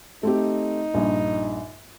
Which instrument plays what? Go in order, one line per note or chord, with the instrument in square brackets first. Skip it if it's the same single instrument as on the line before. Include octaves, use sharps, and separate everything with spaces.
[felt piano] A3 C4 G4 [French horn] D#4
[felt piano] A#1 G2